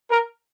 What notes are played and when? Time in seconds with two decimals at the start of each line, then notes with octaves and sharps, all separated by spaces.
0.11 A#4